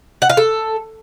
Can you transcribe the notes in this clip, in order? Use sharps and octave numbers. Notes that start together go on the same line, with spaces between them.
F#5
F5
A4